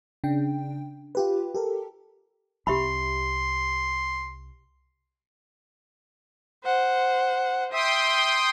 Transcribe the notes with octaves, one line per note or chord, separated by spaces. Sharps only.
C#3 D4 G5
F4 G4 B4
G4 A4 A#4
C2 G4 E5 B5 C6
C5 F#5
E5 G5 C6 D#6